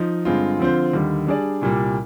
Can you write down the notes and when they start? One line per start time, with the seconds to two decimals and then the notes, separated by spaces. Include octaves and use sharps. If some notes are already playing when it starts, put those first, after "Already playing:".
Already playing: F3 D#4
0.25 G2 D3 G#3 C4 F4
0.59 D3 F3 C4 F4 C5
0.93 D#2 D3 G3
1.27 G3 D4 G#4 D5
1.62 C2 A#2 G3